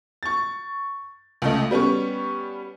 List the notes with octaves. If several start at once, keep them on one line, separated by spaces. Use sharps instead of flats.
C#6 A6
C#2 A3 D#5
G3 B3 C#4 C#6